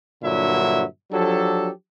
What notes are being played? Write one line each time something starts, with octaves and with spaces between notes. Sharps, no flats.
G2 A#2 D3 F#3 E4 E5
F3 F#3 D4 G4 A4